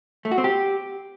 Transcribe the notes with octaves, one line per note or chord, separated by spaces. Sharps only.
A3
F#4
C4
G4